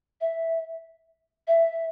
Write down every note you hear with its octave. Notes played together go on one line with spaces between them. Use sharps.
E5
E5